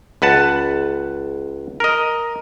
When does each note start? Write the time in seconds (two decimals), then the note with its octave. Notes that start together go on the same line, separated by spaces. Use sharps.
0.22 C#2 B4 F#5 A5
1.80 A#4 D#5